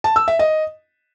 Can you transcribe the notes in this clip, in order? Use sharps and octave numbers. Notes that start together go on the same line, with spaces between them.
A5
E6
E5
D#5